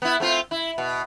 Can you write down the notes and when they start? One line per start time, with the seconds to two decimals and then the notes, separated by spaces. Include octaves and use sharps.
0.02 B3 E4
0.20 A3 C4 F4
0.51 E4
0.78 B2